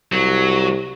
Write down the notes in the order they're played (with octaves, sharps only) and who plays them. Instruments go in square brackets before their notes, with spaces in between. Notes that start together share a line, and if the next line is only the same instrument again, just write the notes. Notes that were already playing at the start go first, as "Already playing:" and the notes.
[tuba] C2 [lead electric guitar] F#3